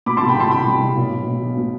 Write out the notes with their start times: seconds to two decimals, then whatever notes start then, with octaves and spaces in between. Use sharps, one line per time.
0.06 B2 B5 D6
0.17 C2 A5 C6
0.29 G5 B5
0.37 C2 A5 C6
0.51 C2 G5 B5
0.67 C2
0.82 C2
0.96 B1
1.11 B1
1.27 B2
1.42 B1
1.57 B2